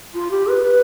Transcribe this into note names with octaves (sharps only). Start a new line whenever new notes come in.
F4
G4
B4
B4